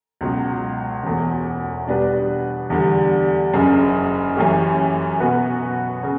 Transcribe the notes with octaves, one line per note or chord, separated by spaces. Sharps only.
C#2 B2 F#3
E1 E2 B2 A3
B2 G3 D4 G4 B4
E2 D3 G3
F#1 F#2 C#3
F#2 E3 A3 C#4 G4
B2 F#3 B3 F#4 B4
C#3